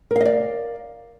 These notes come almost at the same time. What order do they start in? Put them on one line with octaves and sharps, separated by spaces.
A#4 F5 D#5 D5